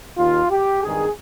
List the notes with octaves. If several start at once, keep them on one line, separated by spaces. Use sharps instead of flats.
D#2 D#3 F4
G4
G#1 G2 D#3 G#4